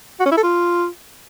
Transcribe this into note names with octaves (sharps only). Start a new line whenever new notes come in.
F#4
C#4
E4
A4
F4